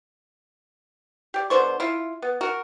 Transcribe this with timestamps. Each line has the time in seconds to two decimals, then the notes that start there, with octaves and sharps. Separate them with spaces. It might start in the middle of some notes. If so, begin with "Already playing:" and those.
1.34 G4 D5
1.50 B2 D3 C5 C#6
1.80 E4 F4
2.22 B3
2.41 F#4 A#4